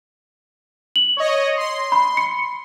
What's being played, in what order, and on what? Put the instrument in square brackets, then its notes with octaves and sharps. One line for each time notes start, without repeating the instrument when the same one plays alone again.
[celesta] F#7
[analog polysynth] C#5 D#5
C6
[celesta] B5
C#7